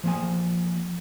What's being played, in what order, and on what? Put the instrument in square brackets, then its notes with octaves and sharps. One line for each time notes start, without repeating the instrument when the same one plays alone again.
[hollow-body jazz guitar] F3 A#3 G#5